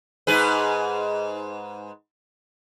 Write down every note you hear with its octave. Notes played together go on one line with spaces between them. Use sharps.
G#2 G#4 B4